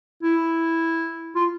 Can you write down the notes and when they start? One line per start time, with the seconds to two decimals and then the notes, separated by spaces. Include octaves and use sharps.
0.23 E4
1.35 F4